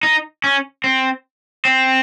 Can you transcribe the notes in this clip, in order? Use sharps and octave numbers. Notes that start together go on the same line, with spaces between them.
D#4
C#4
C4
C4